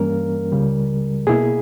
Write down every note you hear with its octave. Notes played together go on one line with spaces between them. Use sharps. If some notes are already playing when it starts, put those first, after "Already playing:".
Already playing: G2 E3 G3 A#3 C#4 A#4
C#2 C#3 G3
B2 A#3 E4 G#4